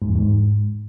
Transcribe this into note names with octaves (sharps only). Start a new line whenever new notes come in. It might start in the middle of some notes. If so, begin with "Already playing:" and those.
G#2
E2
G#2